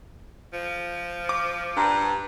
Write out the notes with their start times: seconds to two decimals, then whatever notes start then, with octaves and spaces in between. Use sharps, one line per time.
0.53 F3
1.29 D6
1.77 G2 A#5